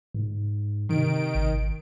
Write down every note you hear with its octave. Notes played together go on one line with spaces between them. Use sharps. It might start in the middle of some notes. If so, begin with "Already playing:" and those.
G#2
C3 D#3 D7
G#1